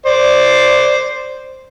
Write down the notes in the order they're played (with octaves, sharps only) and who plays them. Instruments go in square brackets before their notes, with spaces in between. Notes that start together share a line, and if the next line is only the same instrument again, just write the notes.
[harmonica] C5 D5